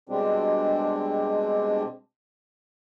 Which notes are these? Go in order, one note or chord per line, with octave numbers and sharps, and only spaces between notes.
B2 G3 G#3 C4 D4